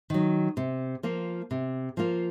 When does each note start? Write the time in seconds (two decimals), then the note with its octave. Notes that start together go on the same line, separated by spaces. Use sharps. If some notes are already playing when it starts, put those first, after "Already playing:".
0.10 D#3 F#3
0.57 C3
1.03 F3 A#3 F4
1.51 C3
1.97 F3 A#3 F4